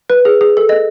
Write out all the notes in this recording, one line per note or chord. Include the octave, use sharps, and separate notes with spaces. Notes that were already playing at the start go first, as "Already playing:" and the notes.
B4
G#4
G#4
A4
D#5